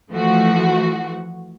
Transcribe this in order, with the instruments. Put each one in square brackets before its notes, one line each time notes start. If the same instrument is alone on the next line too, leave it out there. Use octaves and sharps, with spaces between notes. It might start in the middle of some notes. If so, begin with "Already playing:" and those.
[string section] E3 F3 A3 F#4